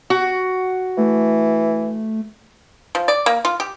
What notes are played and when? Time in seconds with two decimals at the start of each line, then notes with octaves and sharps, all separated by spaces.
0.10 F#4
0.98 E3 A3
2.95 F3
3.08 D5
3.26 A#3
3.45 F4
3.60 G4